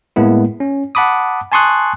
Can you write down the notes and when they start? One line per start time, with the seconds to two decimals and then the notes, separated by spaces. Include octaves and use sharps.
0.16 A2 G#3 A#3 B3 E4
0.60 C#4
0.95 F#5 A5 B5 D6 D#6
1.52 G#5 A5 C6 C#6 D#6 F#6